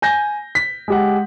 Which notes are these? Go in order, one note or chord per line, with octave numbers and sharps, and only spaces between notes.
G#5 G6 A#6
B6
G#3 G4 F#5